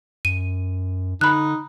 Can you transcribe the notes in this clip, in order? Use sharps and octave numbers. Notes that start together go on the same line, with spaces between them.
F#2 D#7
D3 D#4 B5 F#6